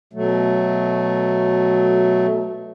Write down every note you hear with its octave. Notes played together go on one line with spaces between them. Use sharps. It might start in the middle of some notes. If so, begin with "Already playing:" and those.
B2 F#3 A3